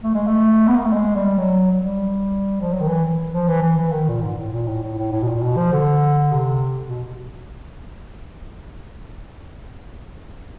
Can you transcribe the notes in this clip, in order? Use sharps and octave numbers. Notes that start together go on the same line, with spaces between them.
A3
G#3
A3
B3
A#3
A3
G#3
G3
F#3
F#3
G3
F3
F#3
D#3
E3
F3
E3
E3
E3
D#3
A#2
G#2
A2
A#2
A2
A2
A2
A2
B2
A#2
B2
F3
D3
C3
B2